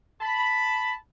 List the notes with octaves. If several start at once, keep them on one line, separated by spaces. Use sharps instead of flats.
A5 B5